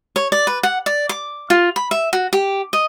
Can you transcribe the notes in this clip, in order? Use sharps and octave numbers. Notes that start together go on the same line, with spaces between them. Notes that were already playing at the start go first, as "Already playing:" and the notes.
C#5
D5
B4
F#5
D5
D6
F4
B5
E5
F#4
G4
D#5